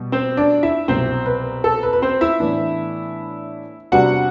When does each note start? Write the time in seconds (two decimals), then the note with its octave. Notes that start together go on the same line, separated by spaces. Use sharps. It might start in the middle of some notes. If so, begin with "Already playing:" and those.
Already playing: B2 G3
0.12 C4 C5
0.37 D4 D5
0.63 E4 E5
0.88 C2 B2 F#3 C4 C5
1.26 B4
1.64 A4
1.83 B4
1.93 B4
2.02 C4 C5
2.21 E4 E5
2.40 A2 E3 B3 D4
3.92 C3 G3 B3 D4 F#4 F#5